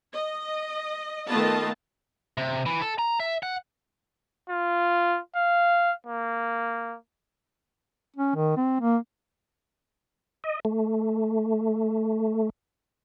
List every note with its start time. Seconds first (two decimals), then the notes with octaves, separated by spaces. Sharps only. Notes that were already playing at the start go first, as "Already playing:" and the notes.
0.14 D#5
1.28 D#3 A3 B3 F4 D#5 A5
2.37 C3
2.66 E3
2.82 A4
2.99 A#5
3.20 E5
3.43 F#5
4.50 F4
5.36 F5
6.06 A#3
8.16 C#4
8.35 D#3
8.57 C4
8.81 A#3
10.44 D#5
10.65 A3